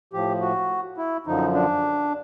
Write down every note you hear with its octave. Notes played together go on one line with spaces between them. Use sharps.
A2 F3 G4
F#4
E4
F#2 D3 F3 D#4
D4